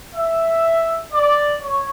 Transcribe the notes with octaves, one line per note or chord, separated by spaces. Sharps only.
E5
D5
C#5